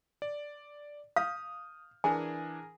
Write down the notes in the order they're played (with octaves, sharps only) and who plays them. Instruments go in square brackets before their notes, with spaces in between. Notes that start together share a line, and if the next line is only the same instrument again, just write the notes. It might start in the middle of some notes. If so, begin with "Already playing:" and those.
[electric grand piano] D5
[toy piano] F5 [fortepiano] D#6 [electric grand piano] F6 G6
[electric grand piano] E3 D4 D#6 [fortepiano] G#4 A#4 [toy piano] G#5